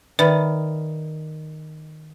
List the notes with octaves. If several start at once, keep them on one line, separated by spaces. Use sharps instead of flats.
D#3 B4 D5 E5 B5